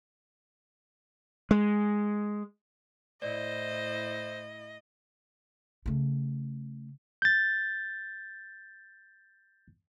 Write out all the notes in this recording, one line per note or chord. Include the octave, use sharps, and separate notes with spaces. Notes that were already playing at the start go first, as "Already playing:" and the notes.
G#3
A2 E4 C5 D5 D#5
C#3 A3
G6 A6